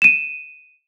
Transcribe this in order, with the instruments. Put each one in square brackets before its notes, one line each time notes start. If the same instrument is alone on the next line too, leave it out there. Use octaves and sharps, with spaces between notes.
[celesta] D#7 E7